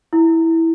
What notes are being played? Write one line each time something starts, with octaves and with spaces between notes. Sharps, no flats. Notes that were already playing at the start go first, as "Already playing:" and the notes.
E4